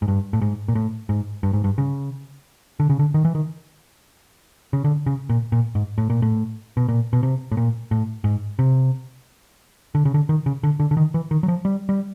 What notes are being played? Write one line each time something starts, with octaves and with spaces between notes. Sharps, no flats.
G#2
G2
A2
G#2
A#2
A2
G#2
G2
G#2
G2
C#3
D3
C#3
D3
D#3
E3
D#3
C#3
D3
C#3
A#2
A#2
G#2
A2
A#2
A2
B2
A#2
B2
C3
A2
A#2
A2
G#2
C3
D3
C#3
D3
D#3
C#3
D3
D3
D3
D#3
E3
D#3
F#3
F3
G3
G3